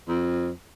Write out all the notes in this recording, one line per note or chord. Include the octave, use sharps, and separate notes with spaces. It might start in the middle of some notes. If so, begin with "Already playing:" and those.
F2